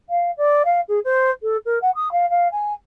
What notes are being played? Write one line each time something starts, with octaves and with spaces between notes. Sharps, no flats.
F5
D5
F5
G#4
C5
A4
A#4
F#5
D#6
F5
F5
G#5